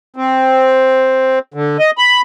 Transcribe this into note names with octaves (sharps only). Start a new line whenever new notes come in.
C4
D3
D#5
B5